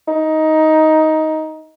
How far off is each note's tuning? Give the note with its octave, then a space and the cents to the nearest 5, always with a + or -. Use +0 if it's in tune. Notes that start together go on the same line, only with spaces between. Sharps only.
D#4 +10